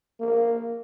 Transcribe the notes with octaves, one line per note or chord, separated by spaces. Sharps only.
A#3